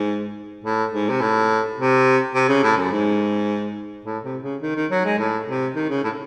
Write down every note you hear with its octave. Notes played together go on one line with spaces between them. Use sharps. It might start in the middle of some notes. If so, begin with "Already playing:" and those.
Already playing: G#2
A2
G#2
C3
A2
C3
C3
C#3
A2
F#2
G#2
A2
C3
C#3
D#3
D#3
F#3
G#3
A2
C3
D#3
C#3
A2